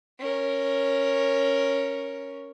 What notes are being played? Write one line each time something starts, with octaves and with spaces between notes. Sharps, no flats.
C#4 A#4